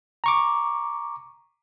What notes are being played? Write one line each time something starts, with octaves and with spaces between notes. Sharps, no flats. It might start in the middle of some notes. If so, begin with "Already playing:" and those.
A#5 C#6 D6